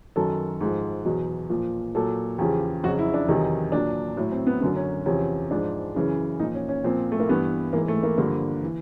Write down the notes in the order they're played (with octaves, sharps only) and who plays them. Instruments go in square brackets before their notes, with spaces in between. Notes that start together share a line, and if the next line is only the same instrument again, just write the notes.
[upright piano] F#2 D#3 F#3 A4
G#2 F3
E2 B2 F#3
A#2 F3
A#2 F#3 A4
E2 C#3 F3 G4
F2 C#3 F#3 F#4
E4
D4
E2 C3 D#3 F#3 D#4
A#2 F#3 D4
A2 F#3
C4
B3
F#2 D3 F#3 B3
C#4
E2 C3 F3 C#4
G#2 F3 D4
F#2 C#3 E3
A#2 D#4
F3
C#4
C#4
A#2 F3 C4
A3
A#3
G2 E3 B3
G#2 E3 A#3
A3
A#3
G2 D3 F3 A#3
E3